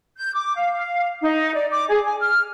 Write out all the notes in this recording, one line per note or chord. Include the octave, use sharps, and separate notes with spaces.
G6
D6
F5
F5
D#4
D5
D6
G#4
G#5
F6